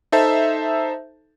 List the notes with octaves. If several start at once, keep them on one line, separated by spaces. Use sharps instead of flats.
D#4 A4 C5 E5 A5